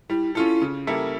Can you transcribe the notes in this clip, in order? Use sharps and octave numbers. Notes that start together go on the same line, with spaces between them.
G3 E4
C#4 E4 F4 A4
C#3
G3 A#3 E4 A4